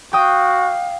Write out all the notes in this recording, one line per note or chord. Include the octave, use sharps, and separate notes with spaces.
F#4 F5 G5 D6 D#6